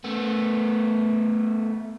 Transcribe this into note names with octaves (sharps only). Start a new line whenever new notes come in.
A3 B3